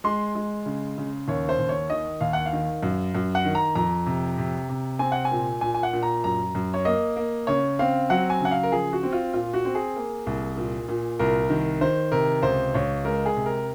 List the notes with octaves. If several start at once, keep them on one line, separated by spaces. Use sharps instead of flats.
G#3 C6
G#3
C#3
C#3
D#2 C#5
C5
D#2
C#5
D#3 D#5
D#2 F5
F#5
F5
D#3
F#2
F#2
F#5
D#3
A#5
F2 A#5
C3
C3
C3
C4 G#5
F#5
G#5
A#2
A#2 G#5
G#5
F#5
A#2
A#5
F#2 A#5
F#2
C#5
A#3 D#5
A#3
C#3 C#5
C4 F5
F#3 F#5
G#5
C#3 F#5
F5
A#4
F3 G#4
F#4
C4
F4
A#2 F4
F#4
C4
G#4
A#3
C2
A#2
A#2
C2 A#4
D#3
D#3 C5
C3 A#4
C#2 C5
C#2 C#5
G#3 A#4
G#4
C3
A#4